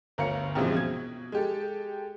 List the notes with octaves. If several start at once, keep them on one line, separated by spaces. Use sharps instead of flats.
G1 D2 A#4 C#5 F5 C#7
A#1 F#2 C3 E3 F3 G#3
B2 G#6
G#3 G4 A4